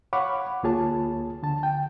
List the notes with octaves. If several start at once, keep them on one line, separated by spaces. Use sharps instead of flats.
C#5 F5 F#5 B5 C#6 D6
D2 A#3 F4 G#4 C#5 A5
D3 A5
G5